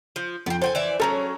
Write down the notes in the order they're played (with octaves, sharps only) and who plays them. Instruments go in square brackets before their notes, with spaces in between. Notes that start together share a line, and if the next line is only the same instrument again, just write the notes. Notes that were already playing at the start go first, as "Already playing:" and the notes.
[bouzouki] F3
[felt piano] F2 [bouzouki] B3 C4
[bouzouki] A4 G5 G#5 [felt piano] C5
[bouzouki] E3 D5 E5
[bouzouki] F#3 G3 C#4 [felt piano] A4 A#5